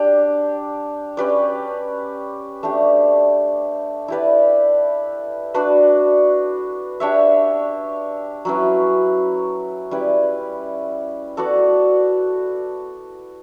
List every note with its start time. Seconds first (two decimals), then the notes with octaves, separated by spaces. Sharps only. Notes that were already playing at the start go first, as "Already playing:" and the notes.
Already playing: D4 G4 D5
1.17 C#4 G4 B4 D5
2.63 A3 D4 G4
4.08 E4 G4 B4 D5
5.54 D4 F#4 B4 D5
7.00 D4 G4 C#5 E5
8.45 F#3 C#4 E4 B4
9.91 G3 C#4 E4 B4
11.37 B3 F#4 A4 D5